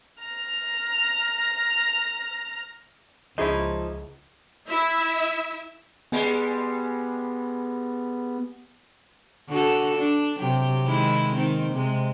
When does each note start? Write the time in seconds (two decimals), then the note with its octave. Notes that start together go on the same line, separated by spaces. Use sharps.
0.23 A#5 F6
3.38 C#2 F3 C#4 D#4 E4 G#4 D#5
4.68 E4 E5
6.12 G3 G#3 B3
9.49 D3 F#4 A4
9.97 D4
10.39 C3 F#3 G4
10.86 D#3 G#3 E4
11.35 D#3 C4
11.73 C3 G#3